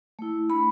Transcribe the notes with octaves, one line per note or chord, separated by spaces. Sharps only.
A3 E4
A3 D4 B5